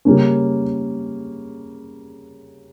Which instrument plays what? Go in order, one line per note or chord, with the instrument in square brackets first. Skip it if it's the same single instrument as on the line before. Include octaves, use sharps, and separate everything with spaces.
[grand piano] C#3 G3 A#3 C#4